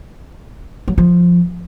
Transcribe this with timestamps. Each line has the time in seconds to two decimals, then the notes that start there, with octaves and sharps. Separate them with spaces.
0.88 F#3
0.98 F3